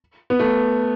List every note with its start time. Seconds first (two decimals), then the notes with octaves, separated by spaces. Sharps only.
0.30 B3
0.40 A3